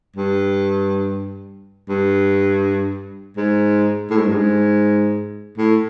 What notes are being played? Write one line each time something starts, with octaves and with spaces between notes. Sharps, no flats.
G2
G2
G#2
A2
G#2
G2
G#2
A2